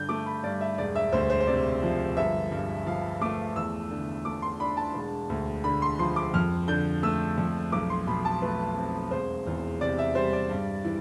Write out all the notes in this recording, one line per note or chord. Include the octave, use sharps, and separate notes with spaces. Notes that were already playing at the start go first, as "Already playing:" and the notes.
Already playing: G2 D3 G6
A3 D6
B5
G2 D5
E5
E1 D5
E5
D2 C5
C5
C5
C3 D5
F3
G1 E5
G2
F3 F5
A3 D6
E2 E6
D3
A3 D6
C6
D4 B5
A5
E1
D2
D3 B5
C6
F3 C6
D6
F2 F6
D3 G6
A3 E6
F2
B1 D6
C6
B2 B5
A5
A3 B4
C4
E1 C5
E2
C3 D5
E5
G3 C5
D5
G2
E3